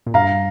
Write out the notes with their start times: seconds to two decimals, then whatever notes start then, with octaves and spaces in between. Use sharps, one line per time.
0.06 A#2
0.14 G2 F5 A#5